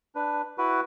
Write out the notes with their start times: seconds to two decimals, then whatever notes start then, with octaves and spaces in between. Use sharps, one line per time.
0.15 D4 B4
0.58 E4 F#4 B4